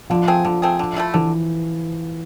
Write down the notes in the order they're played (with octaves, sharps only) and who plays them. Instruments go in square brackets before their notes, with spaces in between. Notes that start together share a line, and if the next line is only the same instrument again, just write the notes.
[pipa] D3 [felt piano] F3
[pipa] A3 C4 G#4
[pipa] D3 [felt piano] F3
[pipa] A3 C4 G#4
D3
F3 A3 E4
[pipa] D3 [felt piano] E3